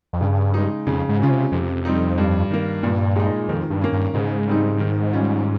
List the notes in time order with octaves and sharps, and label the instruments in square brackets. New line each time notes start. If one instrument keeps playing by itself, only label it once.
[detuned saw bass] F2
[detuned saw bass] G2 [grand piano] C#3
[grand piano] G#3 D#4
[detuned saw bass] F2 [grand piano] C#3
[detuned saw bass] G#2
[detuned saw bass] C#3 [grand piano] G#3 C#4 F4
[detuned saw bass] C3
[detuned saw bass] F2 [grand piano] C3
[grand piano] G3 C4 D#4
G2
D#3 A#3
[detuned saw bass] G2 [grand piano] A#2
[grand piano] G#3 D#4
[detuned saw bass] F2 [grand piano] D#3
[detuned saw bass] G2
[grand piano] A#3 C#4
[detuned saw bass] G2
[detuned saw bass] G#2 [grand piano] C#3
[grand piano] G3 C4 D#4
D#3
G3 C#4 F4